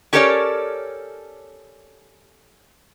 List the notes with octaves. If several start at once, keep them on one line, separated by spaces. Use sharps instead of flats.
C#4 G4 A4 A#4 C#5 D5